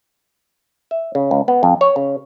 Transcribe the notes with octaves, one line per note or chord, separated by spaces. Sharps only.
E5
C#3
C#2
B3
F2
C#5
C#3